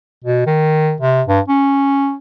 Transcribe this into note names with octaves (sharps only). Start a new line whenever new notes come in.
B2
D#3
C3
G2
C#4